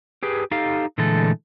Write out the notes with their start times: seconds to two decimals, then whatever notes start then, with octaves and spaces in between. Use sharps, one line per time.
0.23 G4 G#4 B4
0.51 D#4 G4 A4 F5
0.98 A#2 D3 E3 G#3 A3 A4